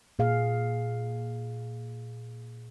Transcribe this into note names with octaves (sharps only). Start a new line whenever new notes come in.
A#2 G#4 F5